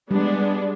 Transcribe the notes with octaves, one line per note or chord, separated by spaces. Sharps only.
G3 G#3 B3 D4